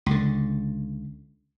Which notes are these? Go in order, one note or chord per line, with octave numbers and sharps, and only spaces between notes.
C#2 D3